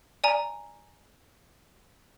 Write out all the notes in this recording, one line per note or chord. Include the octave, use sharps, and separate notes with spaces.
D5 G#5 A#5